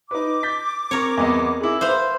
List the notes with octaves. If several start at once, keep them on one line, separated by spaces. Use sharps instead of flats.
D#4 B4 D6
G6 A6 B6
C4 A#4 C#5 C#6
E2 B3 D#5
E4 G#4
B4 C5 E5 F5